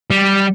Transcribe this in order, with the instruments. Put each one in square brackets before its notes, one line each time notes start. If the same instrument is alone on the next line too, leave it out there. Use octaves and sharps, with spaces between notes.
[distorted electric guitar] G3